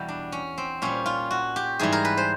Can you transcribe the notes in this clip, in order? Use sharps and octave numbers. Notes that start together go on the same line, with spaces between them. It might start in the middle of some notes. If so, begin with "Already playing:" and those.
Already playing: E2 B2 G3
D4
C#4
C4
A#2 G3 C#4
F4
F#4
G4
G#2 E3 G3 G#4
A#4
B4
C5